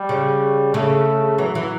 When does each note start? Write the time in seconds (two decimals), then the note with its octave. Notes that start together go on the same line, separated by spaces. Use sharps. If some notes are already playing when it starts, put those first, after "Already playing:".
Already playing: G3
0.09 C#3
0.74 C#3 A3
1.38 E3 F#3
1.55 E3